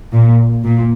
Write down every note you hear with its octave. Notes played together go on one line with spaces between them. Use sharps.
A#2
A#2